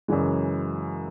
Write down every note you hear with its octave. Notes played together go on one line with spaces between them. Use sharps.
F#2 C#3 E3 G#3